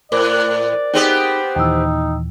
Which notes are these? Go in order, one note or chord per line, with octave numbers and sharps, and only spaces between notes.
A2 A#4 C5 D5 D6
B3 C4 D#4 G4 G#4
D#2 A#2 E3 D#4 G5 E6